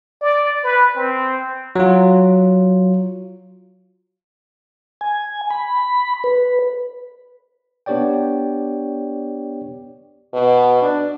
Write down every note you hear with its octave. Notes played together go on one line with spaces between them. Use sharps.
D5
B4
C4
F#3 F4
G#5
B5
B4
B3 D4 G4 C#5 D5 G5
B2
D4